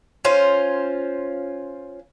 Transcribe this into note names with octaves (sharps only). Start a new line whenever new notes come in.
C#4 F4 C5